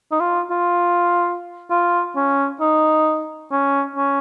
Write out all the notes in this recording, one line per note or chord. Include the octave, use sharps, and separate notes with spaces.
D#4
F4
F4
F4
C#4
D#4
C#4
C#4